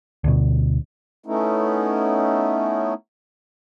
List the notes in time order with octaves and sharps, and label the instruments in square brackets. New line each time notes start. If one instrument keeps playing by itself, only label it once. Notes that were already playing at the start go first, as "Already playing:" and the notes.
[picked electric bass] D2 B2
[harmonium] A3 B3 C#4 D#4 E4